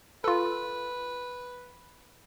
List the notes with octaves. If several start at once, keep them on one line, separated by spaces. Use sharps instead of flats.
F4 A4 B4